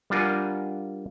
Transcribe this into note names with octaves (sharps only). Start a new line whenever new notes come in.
G3 D4 F4 A#4 F#5 G#5